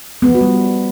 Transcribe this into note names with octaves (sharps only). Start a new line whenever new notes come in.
B3
F3
F#4
G3